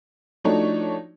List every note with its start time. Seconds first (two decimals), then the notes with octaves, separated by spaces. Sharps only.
0.44 F3 A3 D4 D#4 F#4 C#5